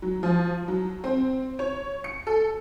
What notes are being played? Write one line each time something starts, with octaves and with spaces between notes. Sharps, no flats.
F#3
F3
F#3
C4
C#5
C#7
A4